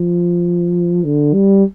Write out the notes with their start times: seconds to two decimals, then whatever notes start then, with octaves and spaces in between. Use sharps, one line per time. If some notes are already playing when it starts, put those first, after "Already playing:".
Already playing: F3
1.04 D3
1.34 G3